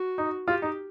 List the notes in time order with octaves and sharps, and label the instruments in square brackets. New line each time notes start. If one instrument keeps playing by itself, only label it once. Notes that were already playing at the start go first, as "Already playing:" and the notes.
Already playing: [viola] F#4
[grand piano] D#4
[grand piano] F4 [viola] G4
[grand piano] D#4